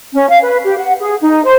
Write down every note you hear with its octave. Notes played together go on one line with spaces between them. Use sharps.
C#4
F5
B4
G4
F#5
G#4
D#4
C5